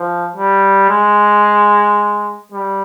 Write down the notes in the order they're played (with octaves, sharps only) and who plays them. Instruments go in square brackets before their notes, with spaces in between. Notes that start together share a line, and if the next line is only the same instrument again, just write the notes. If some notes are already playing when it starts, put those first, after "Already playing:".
Already playing: [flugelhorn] F3
G3
G#3
G3